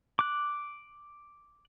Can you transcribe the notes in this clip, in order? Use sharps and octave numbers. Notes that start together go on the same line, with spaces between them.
D6 F#6